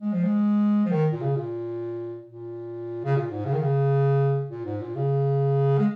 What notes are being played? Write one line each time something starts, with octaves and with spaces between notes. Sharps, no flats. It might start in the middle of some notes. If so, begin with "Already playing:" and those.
G#3
F3
G#3
F3
D#3
A#2
C#3
A#2
A#2
C#3
A#2
G#2
C#3
D#3
C#3
A#2
G#2
A#2
C#3
G#3